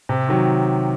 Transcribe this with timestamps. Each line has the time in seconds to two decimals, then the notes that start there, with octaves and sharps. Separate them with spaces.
0.09 C3
0.28 D#3 F#3